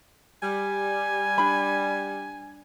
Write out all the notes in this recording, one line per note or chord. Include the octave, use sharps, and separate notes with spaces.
G3 G#5
D4 B5